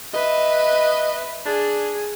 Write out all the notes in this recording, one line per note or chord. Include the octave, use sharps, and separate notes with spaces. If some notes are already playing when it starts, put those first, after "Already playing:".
B4 D#5 E5
D4 G#4